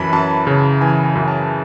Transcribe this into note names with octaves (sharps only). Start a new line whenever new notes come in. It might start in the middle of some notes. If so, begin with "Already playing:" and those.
Already playing: F#2 E3 A5 B5
F#2 A5
C#3
E3 G#5
G#5
F#2
A5